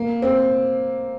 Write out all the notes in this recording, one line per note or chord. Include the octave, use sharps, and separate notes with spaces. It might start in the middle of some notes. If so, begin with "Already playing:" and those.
Already playing: A#3
C4